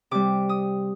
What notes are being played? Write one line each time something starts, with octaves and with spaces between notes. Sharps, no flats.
C3 G3 D6
D#6